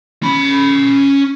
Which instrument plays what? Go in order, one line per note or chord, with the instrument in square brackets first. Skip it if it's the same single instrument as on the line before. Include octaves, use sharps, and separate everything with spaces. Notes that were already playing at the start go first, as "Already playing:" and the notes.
[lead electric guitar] C#4 B5